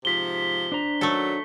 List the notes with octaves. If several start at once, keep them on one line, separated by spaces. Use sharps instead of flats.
G#2 C3 F3 B6 G7
D4 C5 A#5
F#2 D#3 F#3 A3 A4